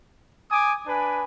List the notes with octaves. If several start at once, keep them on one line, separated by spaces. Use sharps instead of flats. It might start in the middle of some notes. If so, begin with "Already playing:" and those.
G#5 D6 D#6
D4 B4 G#5